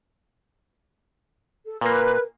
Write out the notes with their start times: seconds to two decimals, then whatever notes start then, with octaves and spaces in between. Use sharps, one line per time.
1.65 A4
1.81 A#2 A#3 A#4 B4